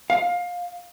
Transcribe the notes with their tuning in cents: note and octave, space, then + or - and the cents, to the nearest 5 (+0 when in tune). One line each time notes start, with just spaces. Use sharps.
F5 +20